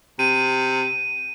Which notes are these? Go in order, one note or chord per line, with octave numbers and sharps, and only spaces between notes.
C3 D#7